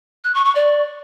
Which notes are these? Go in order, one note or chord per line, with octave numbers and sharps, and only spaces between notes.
F#6
C#6
C#6
D5